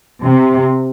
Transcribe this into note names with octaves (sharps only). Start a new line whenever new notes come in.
C3